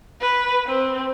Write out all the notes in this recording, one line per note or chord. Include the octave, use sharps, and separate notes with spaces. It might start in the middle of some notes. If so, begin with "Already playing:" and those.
B4
C4